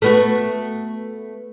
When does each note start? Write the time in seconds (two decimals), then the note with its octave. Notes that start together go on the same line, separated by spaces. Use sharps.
0.02 A3 B3 F#4